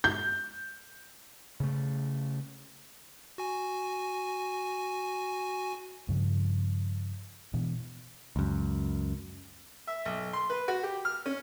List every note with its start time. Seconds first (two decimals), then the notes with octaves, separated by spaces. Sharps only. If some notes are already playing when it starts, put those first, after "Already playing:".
0.04 G6
1.60 C#3 A3
3.38 F#4 G#5
6.09 G2 C#3 F3
7.54 B2 E3
8.36 C#2 F#2
9.87 E5
10.05 B1
10.33 C6
10.50 B4
10.68 F#4
10.83 G4
11.05 F6
11.26 C#4